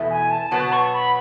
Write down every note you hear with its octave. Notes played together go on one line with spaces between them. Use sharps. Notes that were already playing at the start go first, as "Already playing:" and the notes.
Already playing: E2 B2 A3 E4
G#5
A5
B2 F#3 B3 A5
C#6
B5